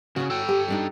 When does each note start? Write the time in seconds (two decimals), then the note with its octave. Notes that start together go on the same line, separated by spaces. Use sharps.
0.16 C#3 F#4 C#5
0.30 A4 G5
0.48 G4 G#5
0.68 G3 D4 D#4